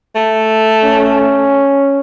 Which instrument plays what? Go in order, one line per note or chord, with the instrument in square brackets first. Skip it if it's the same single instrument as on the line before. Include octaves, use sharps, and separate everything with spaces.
[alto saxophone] A3
[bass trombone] C#4